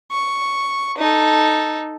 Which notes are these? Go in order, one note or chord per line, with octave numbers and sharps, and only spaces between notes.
C#6
D#4 A4